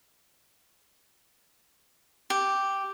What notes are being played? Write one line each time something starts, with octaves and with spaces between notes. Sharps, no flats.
G4